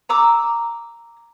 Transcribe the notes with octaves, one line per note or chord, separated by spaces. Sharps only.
A#5 D6 E6